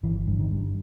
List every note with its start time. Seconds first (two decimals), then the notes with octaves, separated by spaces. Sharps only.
0.03 G1 E3
0.27 G2
0.39 D#3
0.51 G2